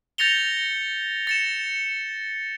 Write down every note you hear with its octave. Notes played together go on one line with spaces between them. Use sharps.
G6 A6 A#6 C#7 F7 G7
A6 C#7 E7